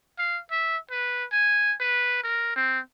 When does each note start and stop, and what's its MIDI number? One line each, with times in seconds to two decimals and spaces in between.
0.18 0.40 77
0.51 0.77 76
0.91 1.25 71
1.32 1.74 80
1.80 2.23 71
2.23 2.55 70
2.56 2.79 60